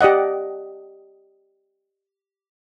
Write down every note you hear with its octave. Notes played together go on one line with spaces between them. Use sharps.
G4 D5 D#5 F#5